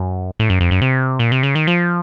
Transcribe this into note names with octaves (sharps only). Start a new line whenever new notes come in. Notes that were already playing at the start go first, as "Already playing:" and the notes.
Already playing: F#2
A2
F#2
F2
F#2
C3
A#2
C3
C#3
D#3
F3